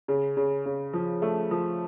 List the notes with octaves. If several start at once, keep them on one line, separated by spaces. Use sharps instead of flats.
C#3
C#3
C#3
F3
A3
F3